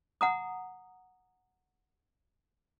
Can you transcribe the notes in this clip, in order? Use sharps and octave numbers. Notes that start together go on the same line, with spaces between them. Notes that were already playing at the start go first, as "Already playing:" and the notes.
F#5 A#5 D#6